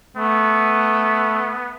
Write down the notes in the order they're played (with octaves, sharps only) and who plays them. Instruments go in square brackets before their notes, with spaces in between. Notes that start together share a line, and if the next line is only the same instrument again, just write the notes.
[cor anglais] A3 [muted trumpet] B3